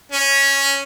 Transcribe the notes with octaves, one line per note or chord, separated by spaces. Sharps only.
C#4